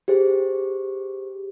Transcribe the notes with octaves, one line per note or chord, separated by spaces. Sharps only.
G4 G#4 C5